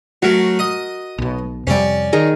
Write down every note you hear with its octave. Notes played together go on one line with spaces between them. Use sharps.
F#3 A3 F#4 A#4
D#5 D#6
B1 B2
F2 C3 G3 C#4 D5
D#3 G#4 A#5